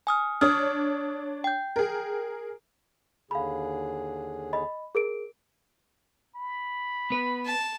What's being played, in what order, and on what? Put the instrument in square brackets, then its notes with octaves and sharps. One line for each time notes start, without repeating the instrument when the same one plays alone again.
[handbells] G#5 D#6 F6
[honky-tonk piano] D4 C#5 [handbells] D#6 F6
[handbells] G5 G6
[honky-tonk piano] G#4 A#4
[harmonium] D#2 D3 G#4 [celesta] F5 B5
[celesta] D#5 B5
G#4 A#4 D7
[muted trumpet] B5
[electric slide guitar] B3 B4
[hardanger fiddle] A5